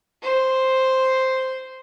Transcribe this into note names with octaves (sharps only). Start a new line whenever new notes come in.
C5